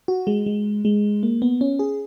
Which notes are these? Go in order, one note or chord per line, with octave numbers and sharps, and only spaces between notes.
F#4
G#3
G#3
G#3
A#3
B3
C#4
G#4